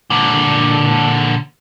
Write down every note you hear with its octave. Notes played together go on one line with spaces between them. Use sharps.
A#2 D3